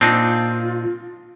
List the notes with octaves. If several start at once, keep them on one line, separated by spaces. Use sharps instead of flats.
A#2 C4 D4 D#4 F4 A5